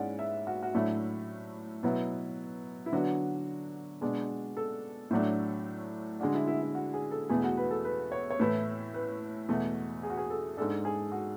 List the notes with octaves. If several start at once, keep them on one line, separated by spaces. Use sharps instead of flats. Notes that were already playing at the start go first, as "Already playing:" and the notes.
Already playing: G#2 G#3 C#4 E4 D5 F#5
E5
F#4
F#4
A2 F#3 A3 D4 E4
B2 F#3 B3 E4
E4
D3 F#3 B3 D4 F#4
B2 G#3 D4
A4
A2 F#3 A3 D4
D3 G#3 D4 F#4
E4
E4
E4
F#4
G#4
A4
E2 B2 A3 E4 G#4
F#4
B4
A4
B4
C#5
C#5
A2 E3 A3 E4 B4
B4
E2 B2 A3
G#4
F#4
G#4
A4
G#2 G#3 D4 A4
G#4
F#4